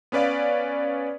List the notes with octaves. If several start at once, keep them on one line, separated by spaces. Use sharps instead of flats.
B3 C#4 B4 D5 F5